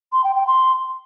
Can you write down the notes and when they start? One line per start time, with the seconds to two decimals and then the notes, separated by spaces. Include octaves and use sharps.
0.12 C6
0.24 G5
0.36 G5
0.47 C6